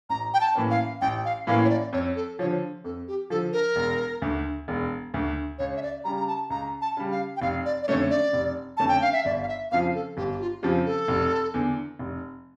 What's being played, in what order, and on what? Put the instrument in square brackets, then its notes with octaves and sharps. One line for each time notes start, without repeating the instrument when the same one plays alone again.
[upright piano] A1 [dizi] A#5
[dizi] G5
A5
[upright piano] A2 E3 A#3 C#4
[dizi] F5
[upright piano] A1 [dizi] G5
[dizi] F5
[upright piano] A2 E3 A#3 C#4 [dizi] F5
[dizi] C#5
D5
[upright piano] F2 [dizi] C#5
[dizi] A4
[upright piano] F3 [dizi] C#5
[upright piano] D3
[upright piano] F2 [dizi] A4
[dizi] G4
[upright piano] D3 F3 [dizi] A4
[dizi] A#4
[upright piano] E1
D2 D3
E1
D2 D3
[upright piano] C#2 [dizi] C#5
[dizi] E5
D5
[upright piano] C#3 G3 [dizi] A#5
[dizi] A#5
A5
[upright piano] C#2 [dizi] A#5
[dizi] A5
[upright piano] C#3 G3
[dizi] F5
G5
[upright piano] F1 [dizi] F5
[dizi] D5
D5
[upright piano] F2 D3 A3 C#4 [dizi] C#5
[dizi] D5
[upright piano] F1
[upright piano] F2 D3 A3 C#4 [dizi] A5
[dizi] G5
F5
E5
[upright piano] G1 [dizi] D5
[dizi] F5
E5
[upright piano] F2 C#3 F3 [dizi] F5
[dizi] A4
[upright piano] G1 [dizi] G4
[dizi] G4
F4
[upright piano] F2 C#3 F3 [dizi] G4
[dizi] A4
[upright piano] F1
E2 D3
F1